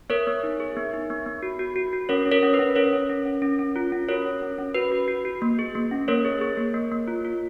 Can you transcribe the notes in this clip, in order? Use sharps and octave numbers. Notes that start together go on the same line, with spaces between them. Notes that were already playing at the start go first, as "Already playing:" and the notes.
B3 A#4 C#5
B3
D#4
G#4
B3
D#4
B3
B3
F#4
F#4
F#4
F#4
C#4 A#4 C#5
C#4
A#4 C#5
C#4
B4
C#4
C#4 A#4 C#5
C#4
C#4
C#4
C#4
C#4
F4
C#4
F#4 A#4 C#5
C#4
C#4
C#4
F#4 B4
F#4
F#4
F#4
A#3
G#4
A#3
C#4
A#3 A#4 C#5
G#4
G#4
A#3
A#3
A#3
F4
F4